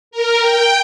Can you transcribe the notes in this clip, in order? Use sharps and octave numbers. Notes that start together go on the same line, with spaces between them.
A#4
G5